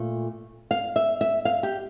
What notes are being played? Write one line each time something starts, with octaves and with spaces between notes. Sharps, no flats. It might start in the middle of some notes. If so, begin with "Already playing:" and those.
Already playing: A#2 A3
F5
E5
E5
F5
G4